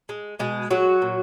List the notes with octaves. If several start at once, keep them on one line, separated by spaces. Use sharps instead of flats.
G#3
B2 G#3 G#4
F#3 G#3 F#4
A#2